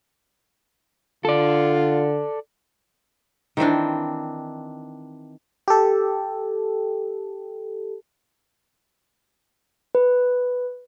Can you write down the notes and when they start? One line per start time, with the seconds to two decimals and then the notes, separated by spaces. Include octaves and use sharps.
1.25 D3 F4 A4 D5
3.57 D#3 E3 C4 D4
5.68 G4 A4
9.95 B4